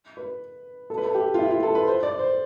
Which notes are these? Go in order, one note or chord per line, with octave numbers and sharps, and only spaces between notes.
B4
A4
B4
A4
G4
F4
E4
F4
A4
B4
C5
D5
C5